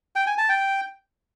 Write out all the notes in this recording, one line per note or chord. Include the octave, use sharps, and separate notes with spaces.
G5
G#5
A5
G5